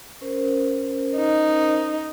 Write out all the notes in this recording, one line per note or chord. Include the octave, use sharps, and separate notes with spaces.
C#4 A#4 C5
D#4